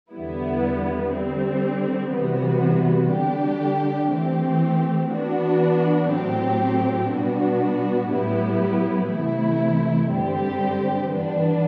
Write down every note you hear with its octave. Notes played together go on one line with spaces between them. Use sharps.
E2 D3 G3 B3 E4
D3 G3 C4
C3 E3 G3 B3 F#4
D3 G3 D4 G4
E3 A3 C4 G4
E3 B3 D4 F#4
A2 F#3 C4 G4
B2 G3 B3 D4 F#4
A2 F#3 B3 E4 G4
C3 E3 A3 E4
G2 D3 G3 C4 G4
E3 B3 D4